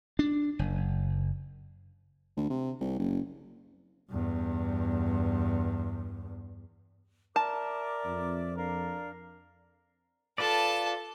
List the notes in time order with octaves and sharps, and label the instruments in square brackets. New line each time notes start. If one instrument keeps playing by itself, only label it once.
[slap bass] D4
F#1
[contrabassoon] D2
C3
C2
F#1
[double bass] E2 G2
[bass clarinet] A#4 [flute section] D5 E5 D6 [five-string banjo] A5
[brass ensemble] F2
[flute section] D4 D5 F5 [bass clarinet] A#4
[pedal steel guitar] F4 B4 D5 [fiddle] A4 A5